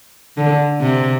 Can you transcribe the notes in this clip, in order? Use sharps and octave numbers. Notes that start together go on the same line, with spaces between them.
D3
C3